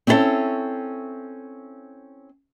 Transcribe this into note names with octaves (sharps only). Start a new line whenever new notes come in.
C4 C#4 E4 F4 A4 C#5